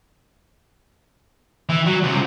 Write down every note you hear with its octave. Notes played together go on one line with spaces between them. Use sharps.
E3
F#3
C#2 C3